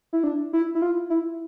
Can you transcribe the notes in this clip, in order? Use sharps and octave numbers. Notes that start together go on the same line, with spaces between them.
E4
D4
E4
E4
F4
E4